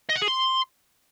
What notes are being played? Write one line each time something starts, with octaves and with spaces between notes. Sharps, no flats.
D#5
F#5
G#4
C6